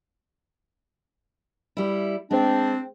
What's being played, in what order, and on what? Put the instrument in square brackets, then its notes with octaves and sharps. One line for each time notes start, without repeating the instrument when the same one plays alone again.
[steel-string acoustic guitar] G3 E4
[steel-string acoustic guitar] G#3 [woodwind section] C4 D4